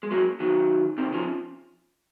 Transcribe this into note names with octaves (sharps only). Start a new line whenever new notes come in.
G#3
F#3 A#3
D#3 F#3
C3 D#3
C#3 F3